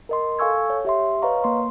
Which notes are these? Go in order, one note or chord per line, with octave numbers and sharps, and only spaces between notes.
A#4 D#5 C6
A4 F5 G#5 C#6 E6 G#6
C#5
G4 E5 C6
B4 C#5 D#5 F5 A#5 C#6
A#3 C6